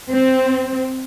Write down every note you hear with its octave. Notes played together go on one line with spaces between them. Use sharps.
C4